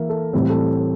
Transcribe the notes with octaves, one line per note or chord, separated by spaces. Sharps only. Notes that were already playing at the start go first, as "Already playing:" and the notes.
Already playing: E3 A#3 A#4 E5
A4
A2 E3 G3 C4
A4